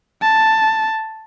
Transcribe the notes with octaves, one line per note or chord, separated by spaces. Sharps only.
A5